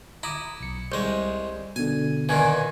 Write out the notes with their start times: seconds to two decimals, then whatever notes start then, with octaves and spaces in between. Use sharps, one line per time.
0.23 E4 A#5 D6 D#6
0.60 B1 C#7
0.92 C2 G#3 G6
1.76 B2 D3 G#5
2.29 A#2 D#3 E3 G#5